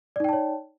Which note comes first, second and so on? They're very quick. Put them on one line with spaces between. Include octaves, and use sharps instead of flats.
D5 D#4 G5 A5 C#5